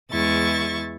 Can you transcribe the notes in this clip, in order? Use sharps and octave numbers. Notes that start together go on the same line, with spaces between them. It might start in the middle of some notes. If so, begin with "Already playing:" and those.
E2 G#3 E4 C#6 A6